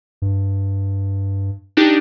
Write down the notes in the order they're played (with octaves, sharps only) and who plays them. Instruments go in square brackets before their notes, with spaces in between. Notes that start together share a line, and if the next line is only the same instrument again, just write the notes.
[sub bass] G2
[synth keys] D4 D#4 G4